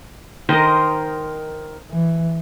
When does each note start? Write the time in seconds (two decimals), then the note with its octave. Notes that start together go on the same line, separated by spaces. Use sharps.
0.49 D#3 A#4 C5 D#5
1.91 E3